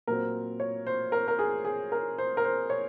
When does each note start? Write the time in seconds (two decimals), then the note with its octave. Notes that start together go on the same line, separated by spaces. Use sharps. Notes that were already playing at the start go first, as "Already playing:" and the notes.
0.07 A#2 F#3 C4 A#4
0.60 C#5
0.87 C5
1.12 A#4
1.28 A#4
1.39 G#4
1.65 G#4
1.92 A#4
2.18 C5
2.37 A#4
2.45 C5
2.70 C#5